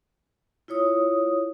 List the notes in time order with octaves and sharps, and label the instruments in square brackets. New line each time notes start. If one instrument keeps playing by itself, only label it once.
[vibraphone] E4 F4 C#5 D#6